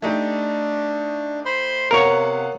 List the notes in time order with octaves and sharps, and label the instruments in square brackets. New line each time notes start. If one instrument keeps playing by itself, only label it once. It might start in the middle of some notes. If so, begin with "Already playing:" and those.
[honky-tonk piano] A3 D#4 G4 [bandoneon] D4
[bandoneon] C5 B5 C6
[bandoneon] C3 [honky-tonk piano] B3 F5 F#5 [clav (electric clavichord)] A#4 C#5